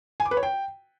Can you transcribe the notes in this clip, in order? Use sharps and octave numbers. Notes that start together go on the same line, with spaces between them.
G#5
D6
B4
C#5
G5